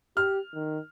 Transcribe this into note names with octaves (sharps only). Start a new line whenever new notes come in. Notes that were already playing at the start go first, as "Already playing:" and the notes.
G4 F6
D#3